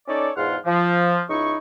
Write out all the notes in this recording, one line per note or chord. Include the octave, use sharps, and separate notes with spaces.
C#4 D#4 A4 C#5 D5
E2 G#2 F4 F#5 C6 F6
F3
C#2 D#4 E4 C#6